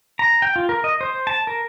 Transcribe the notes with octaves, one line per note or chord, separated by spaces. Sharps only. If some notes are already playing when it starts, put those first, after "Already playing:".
A#5
G5
F4
A#4
D#5
C5
A5
A#4